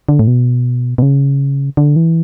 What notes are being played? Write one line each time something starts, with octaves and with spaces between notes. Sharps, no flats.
D3
A2
B2
B2
C#3
D3
E3